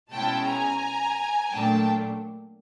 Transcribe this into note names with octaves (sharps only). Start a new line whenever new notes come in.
B2 G#3 C#4 E4 G5 A5
G#5 A#5
A#2 F#3 A3 D4 G5 A5